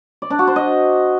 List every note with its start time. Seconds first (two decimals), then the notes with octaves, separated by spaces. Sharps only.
0.22 D5
0.30 D4
0.39 F#4
0.47 C5
0.56 D#5